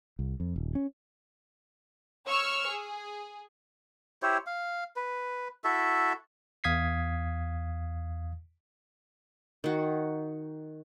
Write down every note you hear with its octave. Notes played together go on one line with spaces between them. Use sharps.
C2
F2
D#1
C#4
C#5 C#6 E6 F6
G#4
E4 G4 C5 C#5
F5
B4
E4 F#4 A4 E5
E2 F5 D#6 G#6 B6 C7
D#3 F#4